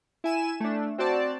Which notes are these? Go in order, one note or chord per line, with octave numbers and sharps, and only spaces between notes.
E4 G#5 E7
A3 D4
C4 F#4 C5 D5 A5